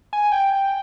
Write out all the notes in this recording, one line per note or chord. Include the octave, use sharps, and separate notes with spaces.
G#5
G5